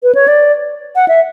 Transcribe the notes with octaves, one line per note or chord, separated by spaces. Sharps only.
B4
C#5
D5
F#5
E5